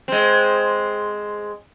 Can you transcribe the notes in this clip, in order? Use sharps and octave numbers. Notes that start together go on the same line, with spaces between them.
G#3 C4